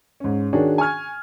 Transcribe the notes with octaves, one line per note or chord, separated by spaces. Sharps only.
G#2 C#4
D#3 D4 F#4 G#4 C#5
G#5 C#6 F6 G#6